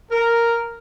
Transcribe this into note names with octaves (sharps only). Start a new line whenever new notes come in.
A#4